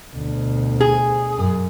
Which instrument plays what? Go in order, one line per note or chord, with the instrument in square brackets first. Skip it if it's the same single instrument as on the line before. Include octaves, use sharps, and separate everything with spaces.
[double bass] D2 B2
[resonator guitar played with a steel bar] G#4
[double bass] F#2